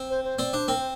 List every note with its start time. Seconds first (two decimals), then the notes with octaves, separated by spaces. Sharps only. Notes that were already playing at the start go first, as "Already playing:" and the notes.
Already playing: C4
0.10 C5
0.24 C5
0.39 C4 D5
0.53 D4 C5
0.68 C4 A#4
0.78 C5